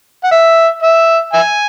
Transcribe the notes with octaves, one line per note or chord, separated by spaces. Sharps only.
F#5
E5
E5
E5 G#5